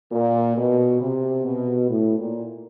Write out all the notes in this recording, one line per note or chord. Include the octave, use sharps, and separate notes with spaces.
A#2
B2
C3
B2
A2
A#2